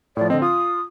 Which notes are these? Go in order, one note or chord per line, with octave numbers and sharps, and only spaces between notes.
A2 F3 D5
D3 C4 D#5
F4 D#6